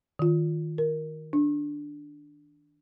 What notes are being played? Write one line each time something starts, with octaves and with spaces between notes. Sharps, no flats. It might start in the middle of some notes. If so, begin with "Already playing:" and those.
D#3 F4
A#4
D4